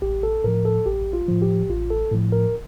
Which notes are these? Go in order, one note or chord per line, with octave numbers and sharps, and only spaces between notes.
A1 G4
A4
A2 F3 A#4
A4
A1 G4
F4
A2 F3
G4
A1 F4
A4
A2 F3
A#4